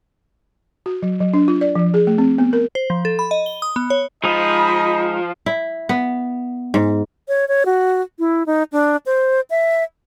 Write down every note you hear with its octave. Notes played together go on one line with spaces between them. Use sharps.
F#4
F#3
F#3
D4
F4
D5
F3
G#4
A3
C4
B3
A#4
C5
F3
A4
B5
D#5
G7
D#6
B3
C#5
F3 G#3 D#4 D#5 B5 D#6
E4
B3
G#2
C#5
C#5
F#4
E4
D#4
D4
C5
E5